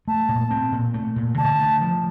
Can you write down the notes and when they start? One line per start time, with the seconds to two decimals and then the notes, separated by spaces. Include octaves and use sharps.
0.08 A3 A5
0.29 A#2
0.51 C4
0.72 A#2
0.94 A3
1.16 A#2
1.38 D3 A5
1.59 A3
1.81 F3